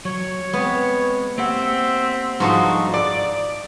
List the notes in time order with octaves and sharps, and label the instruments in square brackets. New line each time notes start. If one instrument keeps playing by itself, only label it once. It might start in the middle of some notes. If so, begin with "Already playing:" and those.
[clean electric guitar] F#3 [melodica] C#5
[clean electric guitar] G#3 C4 [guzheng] B3
[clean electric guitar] A#3 G4 F#5 [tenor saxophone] C4 [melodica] E5
[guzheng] G#2 F3 A4 [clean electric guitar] G3 D4 D#4 [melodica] F#4
[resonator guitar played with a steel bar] D5